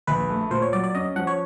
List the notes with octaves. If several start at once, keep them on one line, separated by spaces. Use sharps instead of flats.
A#1 B4
A3
A#2 C5
C#5
F#3 D5
D5
C#4 D#5
F3 F#5
C#5